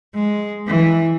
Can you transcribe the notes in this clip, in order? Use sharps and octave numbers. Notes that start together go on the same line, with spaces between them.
G#3
E3